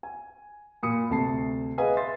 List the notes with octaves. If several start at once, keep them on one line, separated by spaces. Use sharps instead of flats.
G#5
A#2 B5 D#6 C#7
D2 C3 A5 C7
G#4 B4 D#5 F5 F#5 G#5
E5 C6 A6